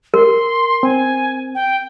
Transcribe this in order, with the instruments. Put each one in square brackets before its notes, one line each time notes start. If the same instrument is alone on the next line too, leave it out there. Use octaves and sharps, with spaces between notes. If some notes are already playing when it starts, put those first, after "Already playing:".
[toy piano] A#4 [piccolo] C6
[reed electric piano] C4 [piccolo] G#5
[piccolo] G5